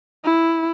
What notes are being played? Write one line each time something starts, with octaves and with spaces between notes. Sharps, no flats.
E4